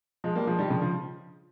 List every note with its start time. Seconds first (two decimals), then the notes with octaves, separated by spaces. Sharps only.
0.24 F3 G#3
0.36 G3 A#3
0.47 F3 G#3
0.59 D#3 G3
0.70 C#3 F3
0.82 C#3 F3